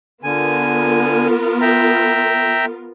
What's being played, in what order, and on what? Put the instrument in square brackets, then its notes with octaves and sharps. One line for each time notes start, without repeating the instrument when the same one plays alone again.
[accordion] D3 G#5 [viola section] B3 F4 A#4
[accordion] E5 G5 A#5